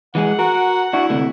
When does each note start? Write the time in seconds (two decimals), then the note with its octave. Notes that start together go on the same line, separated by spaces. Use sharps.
0.15 E3 G#3 G#4 F#5
0.39 F#4 A#4
0.93 D4 E4 F#4
1.10 D2 C3 A3